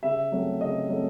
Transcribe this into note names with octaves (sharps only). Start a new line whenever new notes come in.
C#3 E5
F#3 A3 C4
C#3 D#5
F#3 A3 C4